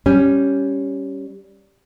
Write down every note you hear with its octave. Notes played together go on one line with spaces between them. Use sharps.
G3 C#4